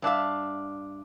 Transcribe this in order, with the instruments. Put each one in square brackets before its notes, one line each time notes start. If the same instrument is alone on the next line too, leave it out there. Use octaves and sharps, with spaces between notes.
[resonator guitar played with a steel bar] G2 D4 E5 F5